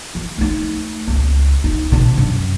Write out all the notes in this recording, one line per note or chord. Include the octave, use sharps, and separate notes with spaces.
E3
A3 D#4
C#2
D#4
C3 D4
F#2